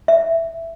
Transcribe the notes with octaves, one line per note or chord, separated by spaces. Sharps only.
E5